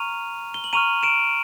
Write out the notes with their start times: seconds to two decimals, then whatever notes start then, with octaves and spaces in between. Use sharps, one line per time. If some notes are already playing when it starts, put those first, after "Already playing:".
Already playing: A#5 C#6 F6 D#7 F7
0.54 G7
0.64 F#7
0.73 A#5 C#6 F6 D#7 F7
1.03 D7 E7